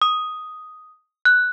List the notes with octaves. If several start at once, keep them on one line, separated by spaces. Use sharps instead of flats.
D#6
F#6